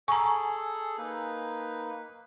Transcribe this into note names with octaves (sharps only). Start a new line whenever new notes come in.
G#4 A4 G#5 A#5 C#6
A#3 D#4 B4